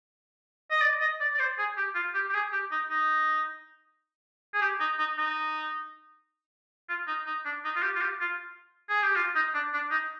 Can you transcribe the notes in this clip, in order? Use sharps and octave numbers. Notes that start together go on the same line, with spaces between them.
D#5
D5
D#5
D5
D5
C5
G#4
G4
F4
G4
G4
G#4
G4
D#4
D#4
G#4
G4
D#4
D#4
D#4
F4
D#4
D#4
D4
D#4
F4
G4
F4
G4
F4
G#4
G4
F4
D#4
D4
D4
D#4